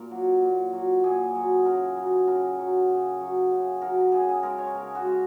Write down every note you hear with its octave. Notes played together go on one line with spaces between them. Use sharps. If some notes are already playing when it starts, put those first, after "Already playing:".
Already playing: A#2 A#4
F#3
A#2
F#3
A#2 G#4
F#3
C#3 A#4
F#3
C#3 A#4
F#3
C#3
F#3
C#3
F#3 A#4
C#3 G#4
G#4
G#3 A#4
C#5
C#3 A#4
F#4
G#3